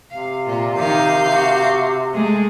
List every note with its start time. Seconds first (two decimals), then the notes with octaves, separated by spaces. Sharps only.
0.11 C3 F5
0.47 A#2 F4
0.79 D#3 F5 G6
1.31 F#4
2.14 G#3 A3 G#4